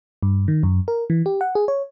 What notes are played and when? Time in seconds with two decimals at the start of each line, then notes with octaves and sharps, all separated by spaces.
0.23 G2
0.48 D#3
0.63 F#2
0.88 A#4
1.10 E3
1.26 G4
1.41 F#5
1.55 G#4
1.68 C#5